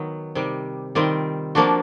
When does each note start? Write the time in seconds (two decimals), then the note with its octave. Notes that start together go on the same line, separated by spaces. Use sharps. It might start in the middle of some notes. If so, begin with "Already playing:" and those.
Already playing: D#3 F#3 B3
0.35 C3 D#3 G3
0.95 D#3 G3 C4 F4
1.55 F3 A#3 D4 F#4